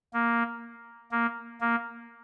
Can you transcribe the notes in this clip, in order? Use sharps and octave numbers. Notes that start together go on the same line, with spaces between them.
A#3
A#3
A#3